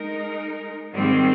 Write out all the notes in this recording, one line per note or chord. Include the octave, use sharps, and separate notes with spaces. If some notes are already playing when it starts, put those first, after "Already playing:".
Already playing: G#3 D#4 A#4
G#2 D#3 G3 C4